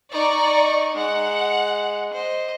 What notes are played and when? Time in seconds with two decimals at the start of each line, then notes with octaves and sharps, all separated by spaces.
0.11 D#4 D5 A#5 C#6
0.96 G#3 F#5
2.13 C5 D#5